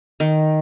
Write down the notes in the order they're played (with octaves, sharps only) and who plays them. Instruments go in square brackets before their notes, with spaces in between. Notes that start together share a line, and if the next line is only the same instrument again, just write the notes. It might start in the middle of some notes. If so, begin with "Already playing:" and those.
[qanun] D#3